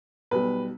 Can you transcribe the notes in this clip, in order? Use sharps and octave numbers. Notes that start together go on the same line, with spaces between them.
B1 B2 G3 B4